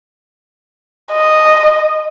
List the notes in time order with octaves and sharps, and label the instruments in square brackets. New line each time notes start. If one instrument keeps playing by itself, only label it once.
[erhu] D#5